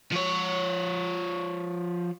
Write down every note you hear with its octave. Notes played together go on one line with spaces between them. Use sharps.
F3 C#5